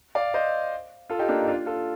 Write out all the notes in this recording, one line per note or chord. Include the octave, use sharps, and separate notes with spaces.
D5 F5
C5 D#5
F4 A4
D#4 G4
A#3 D4
D#4
D4 F4
F4 A4